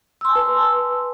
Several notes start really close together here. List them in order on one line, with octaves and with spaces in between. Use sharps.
E6 C6 G#5 A5 B4